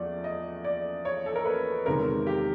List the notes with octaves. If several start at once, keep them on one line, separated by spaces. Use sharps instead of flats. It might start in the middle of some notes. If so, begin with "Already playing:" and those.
Already playing: E2 F3 A3 D5
D#5
D5
C#5
A4
A#4
B4
E2 C3 D#3 G#3 A#4
G4